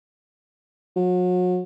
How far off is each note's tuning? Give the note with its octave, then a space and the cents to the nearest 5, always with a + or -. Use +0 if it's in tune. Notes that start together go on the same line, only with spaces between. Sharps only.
F#3 -35